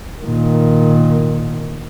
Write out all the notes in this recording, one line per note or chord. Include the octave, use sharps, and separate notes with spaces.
A#2 D#3